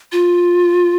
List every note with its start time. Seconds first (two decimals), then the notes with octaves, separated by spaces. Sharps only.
0.12 F4